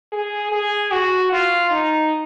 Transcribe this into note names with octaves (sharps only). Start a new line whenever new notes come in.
G#4
G#4
F#4
F4
D#4